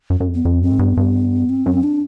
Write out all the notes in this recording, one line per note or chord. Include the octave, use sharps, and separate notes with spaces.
F#2
F#2
F2
B3
F2 C4
F#2 C4
G#2
G2 B3
G2
C4
F#2
D4